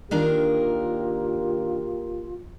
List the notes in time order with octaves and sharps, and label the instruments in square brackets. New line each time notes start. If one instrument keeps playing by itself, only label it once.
[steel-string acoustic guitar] D#3 D4 A#4 [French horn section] A#3 G4 [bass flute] F4